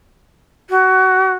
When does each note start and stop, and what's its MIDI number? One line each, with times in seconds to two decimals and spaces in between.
0.69 1.33 66